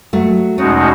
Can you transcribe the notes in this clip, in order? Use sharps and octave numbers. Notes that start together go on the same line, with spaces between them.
F#3 A3
E2 B2 G#3 A3 C#4 D#4 F#4